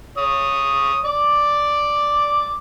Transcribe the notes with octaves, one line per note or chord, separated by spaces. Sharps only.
C#5 D#6
D5 D6